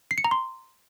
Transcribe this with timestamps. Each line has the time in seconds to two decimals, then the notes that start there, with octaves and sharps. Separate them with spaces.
0.11 C7
0.18 C#7
0.24 A#5
0.31 C6